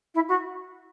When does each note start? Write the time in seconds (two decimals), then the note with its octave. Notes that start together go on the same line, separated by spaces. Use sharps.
0.15 E4
0.28 F#4